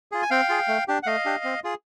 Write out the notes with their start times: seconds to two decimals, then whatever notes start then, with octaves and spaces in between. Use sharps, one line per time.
0.12 F4 G#4
0.22 G#5
0.31 C4 F5 G5
0.49 F4 G#4
0.68 A3
0.88 D4 G4
1.03 F#5
1.06 A3 D#5 F5
1.26 D4 G4
1.44 C4
1.64 F4 G#4